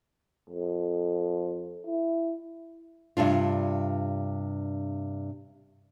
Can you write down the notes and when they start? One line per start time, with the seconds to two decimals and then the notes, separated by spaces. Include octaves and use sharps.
0.49 F2
1.86 E4
3.17 G2 C3 D4 F4